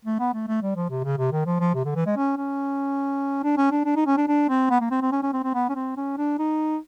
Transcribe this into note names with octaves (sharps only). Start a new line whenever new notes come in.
A3
B3
A3
A3
G3
F3
C3
C#3
C3
D#3
F3
F3
C3
D3
E3
G#3
C#4
C#4
D4
C#4
D4
D4
D#4
C#4
D4
D4
C4
B3
A#3
C4
C4
C#4
C#4
C4
C4
B3
C#4
C4
C#4
D4
D#4